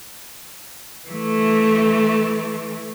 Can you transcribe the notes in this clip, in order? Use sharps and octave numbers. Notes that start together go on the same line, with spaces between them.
E3 A3